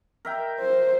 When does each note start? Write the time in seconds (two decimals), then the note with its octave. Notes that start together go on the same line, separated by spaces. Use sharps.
0.25 A#4 E5 G5
0.60 C5